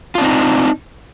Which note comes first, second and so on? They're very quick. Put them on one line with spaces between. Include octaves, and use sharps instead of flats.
F4 D4 C4 D#4